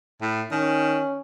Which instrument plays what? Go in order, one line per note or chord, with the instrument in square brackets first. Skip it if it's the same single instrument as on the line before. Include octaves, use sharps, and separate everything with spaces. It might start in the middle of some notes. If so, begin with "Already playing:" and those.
[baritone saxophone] A2
[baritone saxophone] D#3 [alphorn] C#4